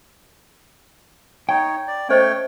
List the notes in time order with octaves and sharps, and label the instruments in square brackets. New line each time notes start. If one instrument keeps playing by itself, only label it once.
[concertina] D#4 C#5 [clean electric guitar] G5
[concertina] D5
[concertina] A3 C#5 G5 [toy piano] C#4 C5 D#5